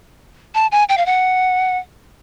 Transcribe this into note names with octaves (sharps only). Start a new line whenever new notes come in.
A5
G#5
G5
F5
F#5